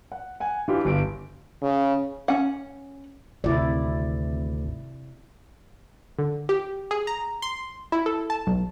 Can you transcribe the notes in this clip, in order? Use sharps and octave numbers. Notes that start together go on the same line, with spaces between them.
F#5
F#5 G#5
E3 D4 F4 G4
G1 G4 D7
C#3
C#4 F#5
G#1 D2 C3 E4 D5
D3
G4
G#4
A#5
C6
E4
A4
A5
B1